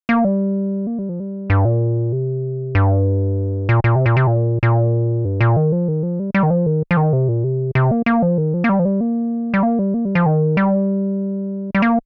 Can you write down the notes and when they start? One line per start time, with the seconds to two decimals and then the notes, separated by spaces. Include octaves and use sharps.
0.09 A#3
0.25 G3
0.87 A#3
0.99 G3
1.09 F3
1.20 G3
1.50 G2
1.65 A#2
2.12 C3
2.75 G2
3.69 A#2
3.84 A#2
3.96 C3
4.06 A#2
4.17 C3
4.27 A#2
4.63 A#2
5.25 G2
5.41 A#2
5.57 D#3
5.72 F3
5.88 D#3
6.03 F3
6.20 G3
6.34 G3
6.43 D#3
6.50 F3
6.66 D#3
6.91 F3
6.97 D#3
7.13 C3
7.29 A#2
7.44 C3
7.75 C3
7.91 A#3
8.06 A#3
8.22 F3
8.38 D#3
8.54 F3
8.64 A#3
8.69 G3
8.79 F3
8.85 G3
9.01 A#3
9.54 G3
9.63 A#3
9.79 G3
9.94 A#3
10.05 G3
10.15 F3
10.26 D#3
10.57 G3
11.75 G3
11.82 A#3